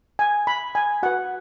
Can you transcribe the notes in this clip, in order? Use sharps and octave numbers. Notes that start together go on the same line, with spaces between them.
G#5
B5
G#5
F#4 B4 F#5